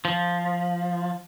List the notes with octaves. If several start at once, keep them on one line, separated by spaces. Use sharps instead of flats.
F3